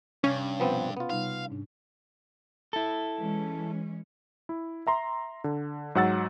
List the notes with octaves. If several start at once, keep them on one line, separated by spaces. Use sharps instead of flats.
G2 C3 C#4
B2 F3 B3 C4 B4
B3 F4
C3 G3 D#4 F5
G#2 D4
E4 A4
E3 G#3 C#4
E4
E5 A#5 C6
D3
G#2 F#3 F#5 E6 A6